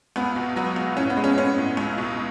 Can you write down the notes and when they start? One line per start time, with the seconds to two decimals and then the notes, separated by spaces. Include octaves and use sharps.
0.16 C#2 B3
0.36 B2
0.56 F#3 B3
0.76 C#2
0.97 A2 C#4
1.10 B3
1.17 G#3
1.24 C#4
1.38 B3 C#4
1.58 A2
1.77 C#2
1.98 B2